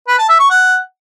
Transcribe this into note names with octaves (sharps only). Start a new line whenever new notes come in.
B4
A5
E5
C#6
F#5